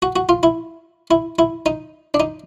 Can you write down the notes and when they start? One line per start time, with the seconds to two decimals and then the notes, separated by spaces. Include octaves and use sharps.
0.02 F#4
0.16 F#4
0.29 F4
0.43 E4
1.11 E4
1.39 E4
1.66 D#4
2.14 D4
2.20 D#4